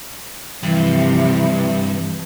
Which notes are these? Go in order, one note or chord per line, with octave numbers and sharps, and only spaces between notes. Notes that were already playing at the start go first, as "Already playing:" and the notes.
G2 C3 E3 F3